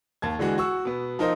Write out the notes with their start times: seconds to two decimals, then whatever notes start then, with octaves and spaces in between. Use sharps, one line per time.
0.22 D#2 A5 G#6
0.39 D3 E3 G#3 F#4
0.58 F#4 C#6 E6
0.85 B2 B3
1.19 F3 D#4 A#4 C5 D#5